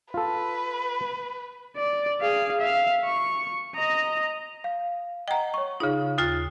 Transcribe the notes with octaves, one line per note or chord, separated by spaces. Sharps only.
F4 A4 B4
D5
G#4 F5
E5 F5
C#6
D#5 A#5
F5
D#5 F#5 G5 A#5
C#5 C#6
C#3 D#4 F4 G#4 F5
D#2 F4 D#6 A6 C7